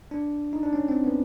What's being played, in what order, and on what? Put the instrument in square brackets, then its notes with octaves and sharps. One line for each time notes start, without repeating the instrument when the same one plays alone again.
[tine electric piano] D4
D#4
D4
C#4
C4
B3